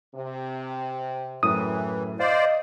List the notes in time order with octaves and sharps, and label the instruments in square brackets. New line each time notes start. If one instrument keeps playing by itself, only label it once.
[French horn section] C3
[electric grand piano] F#2 A2 D#7 [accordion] E3 [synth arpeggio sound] D#6
[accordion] C5 D5 [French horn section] D#5 [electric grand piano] F5